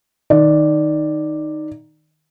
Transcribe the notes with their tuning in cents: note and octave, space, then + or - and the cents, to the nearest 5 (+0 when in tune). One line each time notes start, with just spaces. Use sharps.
D#3 -5 D5 +0